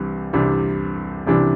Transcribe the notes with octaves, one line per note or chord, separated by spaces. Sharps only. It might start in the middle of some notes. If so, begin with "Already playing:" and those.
Already playing: C2 C3 E3 G3 D4
C2 C3 E3 G3 D4
C2 C3 E3 G3 D4